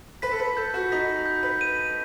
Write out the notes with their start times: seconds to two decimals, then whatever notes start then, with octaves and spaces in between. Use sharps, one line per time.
0.22 B4 B6
0.31 A4
0.40 B4
0.57 A4 G6
0.74 F#4
0.92 D#4 B6
1.26 G6
1.43 B4
1.61 D#7